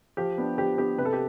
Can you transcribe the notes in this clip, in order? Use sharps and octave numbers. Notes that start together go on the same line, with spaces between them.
F3 G4
B3 D4
F3 G4
B3 D4 G4
C3 B4
A4
G4